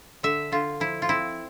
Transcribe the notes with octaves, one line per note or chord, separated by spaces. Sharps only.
D3 E5
D3 F4
F3 E4
F4
C4 E4